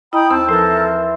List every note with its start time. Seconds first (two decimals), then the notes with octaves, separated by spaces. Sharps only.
0.13 E4 D#5 G5 A#5 B5 D#6
0.30 D#2 C4 A5
0.48 E3 F3 A4 A#4 A5 C6